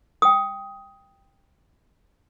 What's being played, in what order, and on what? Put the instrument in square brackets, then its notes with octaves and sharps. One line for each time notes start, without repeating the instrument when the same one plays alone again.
[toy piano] G5 D#6